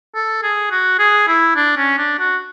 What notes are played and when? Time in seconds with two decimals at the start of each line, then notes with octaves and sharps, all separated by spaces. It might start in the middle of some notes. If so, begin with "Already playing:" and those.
0.15 A4
0.43 G#4
0.71 F#4
0.99 G#4
1.27 E4
1.56 D4
1.77 C#4
1.98 D4
2.19 F#4